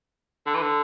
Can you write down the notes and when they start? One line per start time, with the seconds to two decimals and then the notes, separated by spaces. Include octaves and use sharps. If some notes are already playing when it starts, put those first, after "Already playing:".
0.47 D3
0.54 E3
0.62 D3